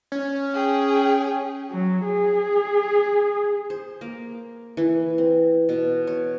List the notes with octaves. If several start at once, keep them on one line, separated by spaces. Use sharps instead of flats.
C#4
G#4 G5
F#3
G#4
C5
A#3
E3
C4
B2
C#5